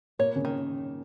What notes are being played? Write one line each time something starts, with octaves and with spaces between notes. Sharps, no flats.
A#2 A#3 C#5
C#3 C#4
D#3